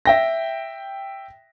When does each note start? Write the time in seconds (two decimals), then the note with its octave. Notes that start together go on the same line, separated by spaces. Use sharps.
0.06 E5 G5 A#6